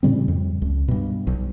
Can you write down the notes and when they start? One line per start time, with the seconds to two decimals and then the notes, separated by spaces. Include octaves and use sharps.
0.03 A2 C#3 G3 C4
0.28 F2
0.62 C#2
0.88 G2 B2
1.27 B1